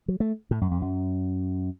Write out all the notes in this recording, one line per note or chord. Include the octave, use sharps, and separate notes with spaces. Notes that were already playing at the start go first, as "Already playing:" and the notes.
F#3
A3
A2
F#2
F2
F#2